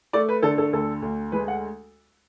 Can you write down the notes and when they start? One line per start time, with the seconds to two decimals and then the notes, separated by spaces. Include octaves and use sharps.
0.13 A3 D5
0.29 B4
0.43 D3 A4
0.58 A4
0.73 D2 A4
1.02 D2
1.32 G#3 B4
1.48 F#5